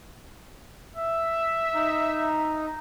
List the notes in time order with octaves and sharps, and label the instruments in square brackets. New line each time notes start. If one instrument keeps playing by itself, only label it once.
[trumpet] E5
[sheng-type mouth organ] D#4